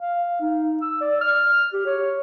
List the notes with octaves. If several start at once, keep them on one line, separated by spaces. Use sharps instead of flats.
F5
D#4
E6
D5
F6
G4
C#5